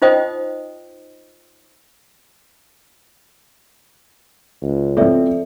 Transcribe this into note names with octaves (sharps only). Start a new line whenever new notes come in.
D#4 F4 C5 D#5 G5 D#6
C#2
F3 C4 A4 D5 E5